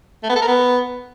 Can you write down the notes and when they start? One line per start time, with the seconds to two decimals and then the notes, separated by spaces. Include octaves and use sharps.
0.23 A3
0.29 B3
0.35 A4
0.42 A#4
0.48 B3